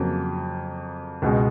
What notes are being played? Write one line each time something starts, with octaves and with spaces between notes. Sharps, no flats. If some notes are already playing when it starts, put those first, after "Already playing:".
Already playing: F2 C#3 F#3 A#3
C#2 B2 G#3